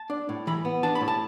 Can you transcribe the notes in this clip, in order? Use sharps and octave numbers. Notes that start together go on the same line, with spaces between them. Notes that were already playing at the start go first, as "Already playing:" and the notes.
Already playing: A5
D4
A2
E3 B5
B3
D4 A5
B5
A2
A5